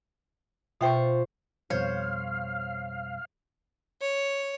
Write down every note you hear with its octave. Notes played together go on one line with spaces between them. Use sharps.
B2 F4 C5 E5 G5 C#6
F2 B2 G3 C5 C#5 F5
C#5